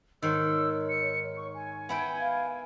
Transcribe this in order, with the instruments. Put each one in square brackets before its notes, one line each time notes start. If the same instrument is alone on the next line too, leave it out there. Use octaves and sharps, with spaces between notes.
[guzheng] G#2 D#3 [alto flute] C#5 [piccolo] E6
[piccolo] C#7
C#6
G#5
[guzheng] B3 E4 G5
[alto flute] F5